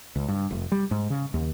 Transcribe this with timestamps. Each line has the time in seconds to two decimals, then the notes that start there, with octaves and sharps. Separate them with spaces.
0.16 C#2
0.28 G2
0.51 F1
0.72 G3
0.91 G#2
1.10 C#3
1.34 D#2